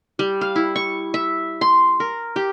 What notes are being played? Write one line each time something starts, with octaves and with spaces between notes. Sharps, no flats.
G3
F5
E4
C#6
E5
C6
A#4
G4